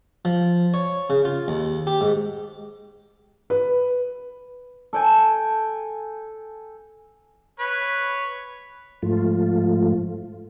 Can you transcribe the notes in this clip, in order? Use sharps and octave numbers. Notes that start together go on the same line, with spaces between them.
F3
C#5
C#3
F4
D#2
G4
G#2
B4
A4 G5 G#5
B4 C#5
G#2 F3 A3 F4